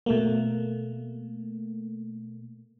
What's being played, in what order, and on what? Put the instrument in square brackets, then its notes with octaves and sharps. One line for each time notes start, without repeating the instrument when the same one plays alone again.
[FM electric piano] B2 A3 A#3